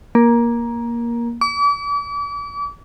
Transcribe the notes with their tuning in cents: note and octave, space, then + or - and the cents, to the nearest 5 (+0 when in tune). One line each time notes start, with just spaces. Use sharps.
A#3 +15
D6 -40